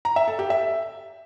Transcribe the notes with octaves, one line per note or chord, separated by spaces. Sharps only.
A#5
E5
A4
G4
E5